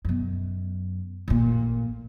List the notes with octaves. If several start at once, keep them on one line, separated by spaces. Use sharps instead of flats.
F#2 B2
A1 A#2